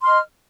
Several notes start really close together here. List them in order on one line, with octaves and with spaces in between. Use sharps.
C6 F6 D#5